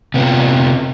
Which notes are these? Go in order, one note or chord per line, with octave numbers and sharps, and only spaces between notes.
C3 B3 C#4 F4